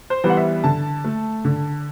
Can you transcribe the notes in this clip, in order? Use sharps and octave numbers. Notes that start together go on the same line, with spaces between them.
C5
E3 G3 B3
F#5
E5
D3 A5
A3
D3